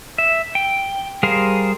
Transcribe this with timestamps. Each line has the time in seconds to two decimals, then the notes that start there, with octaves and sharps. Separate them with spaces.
0.18 E5
0.55 G5
1.23 G3 G#4 A#4 C5 F5